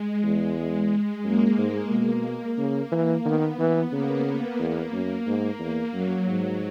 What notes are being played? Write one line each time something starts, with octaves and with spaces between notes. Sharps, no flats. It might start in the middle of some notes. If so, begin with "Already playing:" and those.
Already playing: G#3
E2
F#2 A#3
G#2
B2 A#3
C#3
E3
D#3 B3
E3
C#3 A#3
E2
F#2
G#2 A#3
E2
F#2 F#3
G#2